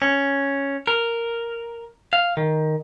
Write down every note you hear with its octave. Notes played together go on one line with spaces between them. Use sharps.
C#4
A#4
F5
D#3